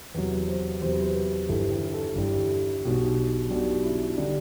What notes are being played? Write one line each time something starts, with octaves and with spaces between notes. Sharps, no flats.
E2 C3 F#3 B4
C5
E2 C3 F#3 C5
B4
C5
B4
G1 G2 E3 G3 A4
G4
A4
G1 G2 E3 G3
B1 B2 G3
B1 B2 G3 D4
E4
D3 G3 D4